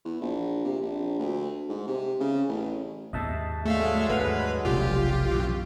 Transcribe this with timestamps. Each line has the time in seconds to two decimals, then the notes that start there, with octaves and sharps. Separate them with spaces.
0.05 E2
0.21 A#1
0.64 C3
0.82 A#1
1.19 D2
1.69 G#2
1.87 C3
2.21 C#3
2.48 A1
3.13 D#2 G#2 D#5 E5 A5
3.65 D3 F#3 G#3 A3 G#4 E5 F5
4.09 D#2 G#2 A3 B4 F#5 F6
4.65 F1 B1 F#2 F4 G4
5.31 F#2 B2 E3